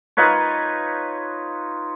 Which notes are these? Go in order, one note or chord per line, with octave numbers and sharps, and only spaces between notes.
D#4 F4 B4 C#5